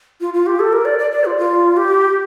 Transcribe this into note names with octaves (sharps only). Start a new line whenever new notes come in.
F4
F4
G4
A4
A#4
D5
D5
D5
F4
F4
G4